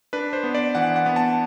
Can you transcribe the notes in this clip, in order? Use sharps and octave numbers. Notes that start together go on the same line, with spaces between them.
D4 B4
C5
B3
D5
E3 F#5
F#5
B3
A5